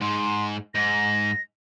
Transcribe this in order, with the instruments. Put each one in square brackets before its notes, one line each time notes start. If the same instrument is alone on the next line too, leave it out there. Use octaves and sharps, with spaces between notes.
[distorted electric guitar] G#2 [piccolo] C6
[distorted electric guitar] G#2 [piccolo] A#6